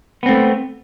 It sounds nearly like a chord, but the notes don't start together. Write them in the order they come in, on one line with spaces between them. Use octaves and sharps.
B3 C4 A3